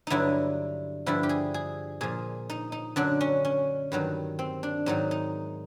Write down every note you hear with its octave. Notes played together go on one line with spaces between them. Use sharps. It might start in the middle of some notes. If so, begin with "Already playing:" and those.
G2 D3 F#3 D#4 E4
G2 D3 F3 E4
G4
G#4
G#4
A#2 F3 G#4
D#4
D#4
F#2 D3 F#3 D4
C#4
C#4
G2 D#3 F#3
C4
D4
G#2 D#3 F#3 D#4
D#4